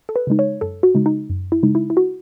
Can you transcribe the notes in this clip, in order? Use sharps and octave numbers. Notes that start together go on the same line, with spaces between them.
A4
B4
C#3 G#3 D#4
C#5
F#2 A4
F#4
C#3 G#3 D#4
D#4
F#2
E4
C#3 G#3 D#4
E4
E4
F#4